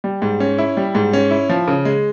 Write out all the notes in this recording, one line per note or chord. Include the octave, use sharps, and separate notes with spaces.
G3
G#2
C#4
E4
G3
G#2
C#4
E4
F3
C#3
G#3